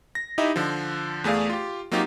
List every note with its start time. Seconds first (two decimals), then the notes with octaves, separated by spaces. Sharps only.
0.15 A#6
0.38 D#4 E4 G4 D#5 E5
0.56 D3 F3
1.24 E2 A3 G#4 D5 F5
1.50 F4 G4
1.92 F#3 A#3 C4 D#4 F4 G4